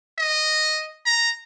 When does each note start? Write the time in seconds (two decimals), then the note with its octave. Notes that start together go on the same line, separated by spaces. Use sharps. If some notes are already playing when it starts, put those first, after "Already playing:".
0.18 D#5
1.06 A#5